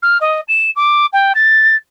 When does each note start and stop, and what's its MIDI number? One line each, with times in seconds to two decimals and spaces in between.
0.02 0.17 89
0.20 0.40 75
0.48 0.70 100
0.76 1.06 86
1.13 1.33 79
1.35 1.75 93